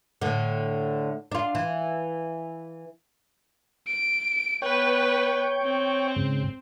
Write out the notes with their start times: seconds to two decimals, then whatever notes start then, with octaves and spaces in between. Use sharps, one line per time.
0.22 A2 D3
1.32 D4 F4
1.55 E3
3.87 D7
4.62 B3 B4 C#5 G5
5.63 C4
6.16 G#2 C#3